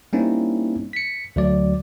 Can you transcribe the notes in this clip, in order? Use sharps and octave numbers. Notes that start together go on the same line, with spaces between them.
G3 A#3 C4 C#4 D#4 E4
B6 C#7
D2 F#3 D5